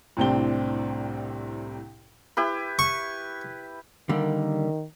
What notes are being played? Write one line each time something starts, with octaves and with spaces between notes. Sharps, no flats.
C2 A2 C3 C4 D4 G7
E4 G4 B4
C#6
D3 D#3 G3 A#3